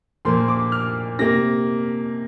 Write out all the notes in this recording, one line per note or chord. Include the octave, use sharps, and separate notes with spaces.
A#2 F3 A#3 C6
D6
F6
C3 A#3 A#6